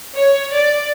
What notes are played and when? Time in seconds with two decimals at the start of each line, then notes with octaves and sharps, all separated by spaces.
0.15 C#5
0.53 D5